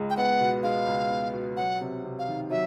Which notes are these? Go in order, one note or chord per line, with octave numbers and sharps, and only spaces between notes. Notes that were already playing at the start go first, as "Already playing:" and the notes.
Already playing: C#2 G#3
G5
B3 F#5
B2
G#3 F5
C#2
B3
B2
F#3 F#5
C3
C3
F5
D#3
F#3 E5